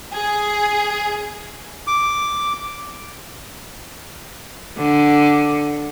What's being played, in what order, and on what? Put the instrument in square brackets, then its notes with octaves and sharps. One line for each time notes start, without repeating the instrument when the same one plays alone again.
[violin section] G#4
[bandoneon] D6
[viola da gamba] D3